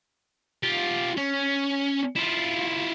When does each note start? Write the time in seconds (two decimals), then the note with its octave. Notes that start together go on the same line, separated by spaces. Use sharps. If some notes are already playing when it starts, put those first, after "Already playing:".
0.63 F4 G4
1.17 C#4
2.16 E4 F4